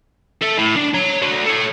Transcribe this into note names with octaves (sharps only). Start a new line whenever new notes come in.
A4 E5
A2
D4
C#5 A#5
D4 F#4
A4 C#5